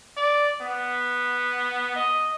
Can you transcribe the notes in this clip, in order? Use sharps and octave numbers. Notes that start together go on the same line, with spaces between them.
D5
B3
D#5